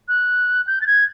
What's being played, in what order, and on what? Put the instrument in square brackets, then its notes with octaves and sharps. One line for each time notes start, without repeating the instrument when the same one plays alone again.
[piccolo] F#6
G6
A6
G#6